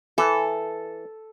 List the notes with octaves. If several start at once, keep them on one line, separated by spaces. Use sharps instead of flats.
E3 A4